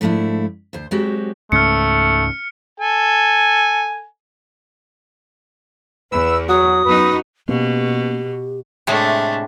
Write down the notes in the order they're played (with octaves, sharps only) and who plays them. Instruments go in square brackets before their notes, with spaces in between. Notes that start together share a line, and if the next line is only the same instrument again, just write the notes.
[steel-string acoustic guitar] G#2 F3 A3 D4 E4
D2 C5
F#3 G#3 C4 F#4 G4
[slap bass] C#2 G#2 C#4 [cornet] A3 [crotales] F6 C#7
[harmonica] A4 G#5
[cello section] E2 [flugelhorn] B4 [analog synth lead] E6
[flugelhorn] F#3 [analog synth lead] F#4 [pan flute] D#6
[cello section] F#2 B3 D#4 [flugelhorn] B4
[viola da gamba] B2 [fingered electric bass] A#3 B3 C#4 [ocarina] G4
[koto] A2 C3 G#3 [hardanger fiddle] A3 D4